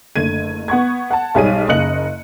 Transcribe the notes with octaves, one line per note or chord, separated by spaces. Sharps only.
F#1 D3 A3 G#6 D#7
B3 F#5 C#6 G#6
F#5 A5
B1 G#2 G3 G#4 C#5 D#7
F#1 C#3 D#5 F#6 C#7 F#7